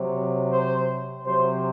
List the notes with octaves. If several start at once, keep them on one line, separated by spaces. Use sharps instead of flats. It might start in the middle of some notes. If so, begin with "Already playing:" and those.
Already playing: C3 F#3
C5
C3 F#3 C5